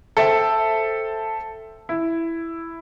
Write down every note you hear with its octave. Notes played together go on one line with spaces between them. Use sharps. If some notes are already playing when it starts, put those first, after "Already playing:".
A4 C5 E5 G5 A5
E4